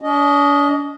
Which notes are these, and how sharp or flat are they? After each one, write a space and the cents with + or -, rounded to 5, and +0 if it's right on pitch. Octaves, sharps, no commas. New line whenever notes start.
D4 -45 D#5 +0